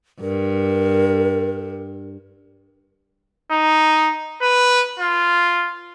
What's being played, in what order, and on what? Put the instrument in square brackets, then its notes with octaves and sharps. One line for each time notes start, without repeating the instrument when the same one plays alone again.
[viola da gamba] G2 [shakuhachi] A#4
[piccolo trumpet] D#4
B4
F4